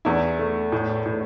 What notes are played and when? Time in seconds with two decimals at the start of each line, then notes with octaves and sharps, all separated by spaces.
0.05 E2 E4
0.39 A3
0.72 A2
1.05 A2